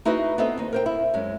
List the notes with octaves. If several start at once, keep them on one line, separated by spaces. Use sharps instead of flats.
D#4 E4 F#4 G#4 B4 D#5
B3 C4 A4 B4 D#5 E5
D#2 D#4
A#4 C5 G5
E4
F#2 G#3 C#4